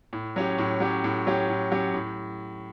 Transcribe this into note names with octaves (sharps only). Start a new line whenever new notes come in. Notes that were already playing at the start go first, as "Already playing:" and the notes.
A2
F#3 C#4 G4
A2
F#3 C#4 G4
A2
F#3 C#4 G4
A2
F#3 C#4 G4
A2